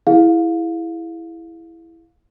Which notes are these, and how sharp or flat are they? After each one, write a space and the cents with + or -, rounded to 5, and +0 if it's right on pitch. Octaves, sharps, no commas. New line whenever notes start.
E4 +0 G#4 +0 F5 +20